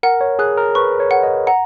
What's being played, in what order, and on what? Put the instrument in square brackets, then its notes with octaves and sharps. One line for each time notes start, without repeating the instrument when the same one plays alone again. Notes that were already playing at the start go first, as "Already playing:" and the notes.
[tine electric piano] A#4 [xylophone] F#5
[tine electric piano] C#5
[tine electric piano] G#4 [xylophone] F#6
[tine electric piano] A#4
[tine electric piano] B4 [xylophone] C#6
[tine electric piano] C#5
[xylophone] F#5
[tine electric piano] D#5
[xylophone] F#5 [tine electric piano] A#5